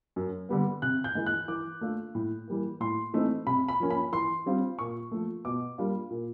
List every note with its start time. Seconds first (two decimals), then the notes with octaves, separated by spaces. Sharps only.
0.16 F#2
0.49 D3 G3 B3
0.82 C3 F#6
1.04 G6
1.15 E3 G#3
1.26 F#6
1.48 E3 D6
1.81 A3 D4 F4
2.15 A2
2.48 E3 G3 A#3
2.80 A2 C6
3.14 E3 A3 C4 D#4
3.47 C3 B5
3.69 B5
3.80 F3 A#3 C#4
3.90 B5
4.12 E3 C6
4.46 G3 C4 F4
4.79 A#2 C#6
5.12 F3 A3
5.45 B2 D6
5.78 G3 A#3 D4 F4
6.11 A#2